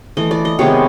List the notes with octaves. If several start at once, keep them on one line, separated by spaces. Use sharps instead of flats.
E3 A3 D#5
D5
D#5
C3 D#3 G#3 B3 C#5